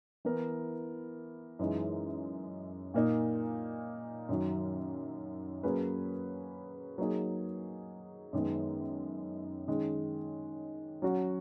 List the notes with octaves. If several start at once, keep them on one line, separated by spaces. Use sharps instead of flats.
E3 B3 E4 A#4
F#2 E3 G#3 D#4
A#2 A#3 D#4
F#2 D#3 F#3
F#3 A#3 C#4 G#4 B4
F#3 A#3 D#4 G#4
F#2 D#3 G#3 B3
D#3 G#3 C#4
F#3 C#4 F#4